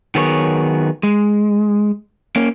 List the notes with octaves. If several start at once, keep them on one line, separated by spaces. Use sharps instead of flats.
D#3 F#3 B3 G#4 A#4 C#5
G#3
A#3 C#4